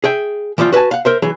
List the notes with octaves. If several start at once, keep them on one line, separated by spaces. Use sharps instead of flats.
G#4 E5 G5
E3 F3 G3 D#4 F4
F#4 B4 D5 G#5 A5
F5 F#5
A#4 C5 E5
E3 F#3 G#4